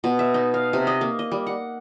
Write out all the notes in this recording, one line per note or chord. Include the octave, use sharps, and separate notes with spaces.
B2
E5
D#4
F5
C3
D#5
A#3
D#5
G3
F#5